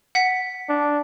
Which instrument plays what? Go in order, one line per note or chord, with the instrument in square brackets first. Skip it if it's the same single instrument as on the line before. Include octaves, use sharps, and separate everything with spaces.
[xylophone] F#5 B6
[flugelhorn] D4